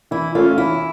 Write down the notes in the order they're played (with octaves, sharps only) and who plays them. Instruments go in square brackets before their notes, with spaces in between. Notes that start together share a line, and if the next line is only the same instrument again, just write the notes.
[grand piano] E3 [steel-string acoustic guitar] E4
[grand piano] A3 C#4 [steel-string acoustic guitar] F4
[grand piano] E3 [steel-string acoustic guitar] E4